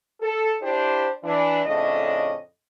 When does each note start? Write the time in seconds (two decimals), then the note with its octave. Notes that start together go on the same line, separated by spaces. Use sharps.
0.21 A4
0.62 D4 E4 G4 C5
1.23 E3 D4
1.65 F2 A2 C#3 A3 D4 D#5